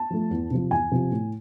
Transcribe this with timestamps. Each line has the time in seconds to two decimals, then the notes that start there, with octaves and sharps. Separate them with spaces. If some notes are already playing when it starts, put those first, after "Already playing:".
Already playing: A5
0.10 F3 A3
0.31 E2
0.50 C3 F3
0.71 E2 G#5
0.91 C3 F3
1.12 A2